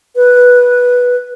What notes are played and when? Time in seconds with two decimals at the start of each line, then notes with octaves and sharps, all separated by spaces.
0.16 B4